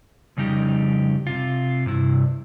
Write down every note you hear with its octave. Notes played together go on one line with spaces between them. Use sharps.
F2 C#3 G3 D#4 G4
C3 F4
G2 C3 E4